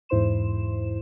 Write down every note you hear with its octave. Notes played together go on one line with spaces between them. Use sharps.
E2 G#2 E4 C5 C6 E7